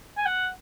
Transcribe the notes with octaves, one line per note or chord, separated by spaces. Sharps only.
G#5
F#5